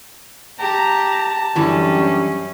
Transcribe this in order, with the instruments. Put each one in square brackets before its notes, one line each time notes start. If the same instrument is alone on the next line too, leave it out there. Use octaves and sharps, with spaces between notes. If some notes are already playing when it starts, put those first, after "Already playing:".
[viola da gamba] G4 [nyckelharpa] A5 [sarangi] A#5
[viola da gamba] F#2 C#4 [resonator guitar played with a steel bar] D3 E3 F#4 [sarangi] G3